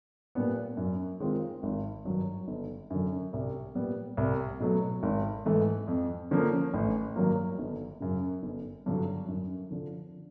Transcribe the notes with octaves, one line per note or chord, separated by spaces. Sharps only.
A#2 G3 B3 D4
F#2
D#3 G#3 C4 F4
G#1
G2 D#3 F#3
G1
F#2 D3
C2
A#2 G3 B3
C2
B2 F#3 A3
G#1
G#2 E3 A3
F2
D3 F3 A#3 C#4
A1
G2 D#3 F#3 A#3
G1
F#2 C#3
G1
G2 D3 F#3
F#2
D3 F3